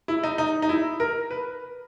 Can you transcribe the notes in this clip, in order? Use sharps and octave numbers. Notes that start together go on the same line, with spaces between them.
E4
D#4
D#4
D#4
E4
A#4
B4